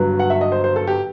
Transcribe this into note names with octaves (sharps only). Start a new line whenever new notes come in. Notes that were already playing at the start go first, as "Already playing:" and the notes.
Already playing: G1 G2 F#3 B4
F#5
E5
D#5
C5
C5
A4
G4